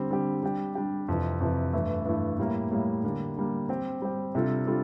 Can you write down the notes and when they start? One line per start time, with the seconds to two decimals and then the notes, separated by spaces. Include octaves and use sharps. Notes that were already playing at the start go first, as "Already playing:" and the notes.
Already playing: D3 G3 C4 G4
0.10 D3 G3 C4 G4
0.43 G3 D4 G4
0.75 G3 D4 G4
1.08 F2 C3 E3
1.40 F2 C3 E3
1.73 G2 E3 A3 E4
2.05 G2 E3 A3 E4
2.38 A2 G3 A#3 E4
2.71 A2 G3 A#3 E4
3.04 D3 G3 A#3 D4
3.36 D3 G3 A#3 D4
3.69 G3 C4 G4
4.02 G3 C4 G4
4.35 C3 G3 D4 F4 A4
4.67 G3 D4 F4 A4